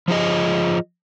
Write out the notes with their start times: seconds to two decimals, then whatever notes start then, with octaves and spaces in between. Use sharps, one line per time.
0.08 F3 F4 G#4 D#5